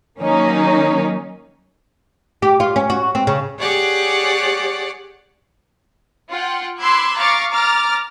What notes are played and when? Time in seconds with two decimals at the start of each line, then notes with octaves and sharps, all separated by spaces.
0.19 D#3 F#3 A#3 C#4 D#4
2.42 G4
2.60 F4
2.76 C#4
2.90 F#4
3.15 C4
3.27 C#3
3.60 G4 G#4 C#5 D5 F#5 D6
6.30 F4 F#5 G5
6.80 B5 C6 D6 E6 F#6 G#6
7.17 F5 A#5 C#6 D6 A6
7.51 A#5 D6 F6 A6